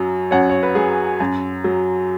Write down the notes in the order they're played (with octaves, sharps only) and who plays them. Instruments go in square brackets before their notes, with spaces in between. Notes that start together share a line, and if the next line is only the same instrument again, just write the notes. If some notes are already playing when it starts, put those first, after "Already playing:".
Already playing: [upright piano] F#2 F#3
F#2 C#5 F#5
C#5
B4
F#3 G#4
F#2
F#3